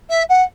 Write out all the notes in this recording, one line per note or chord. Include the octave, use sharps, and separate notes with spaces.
E5
F#5